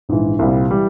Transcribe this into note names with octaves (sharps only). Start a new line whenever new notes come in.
A#1 G#2 E3
C2 A#2 G3 C4
E3 G3